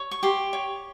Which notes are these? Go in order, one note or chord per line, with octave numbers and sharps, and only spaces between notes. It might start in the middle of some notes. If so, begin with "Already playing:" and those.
Already playing: C#5
C#6
G4 C6
C#5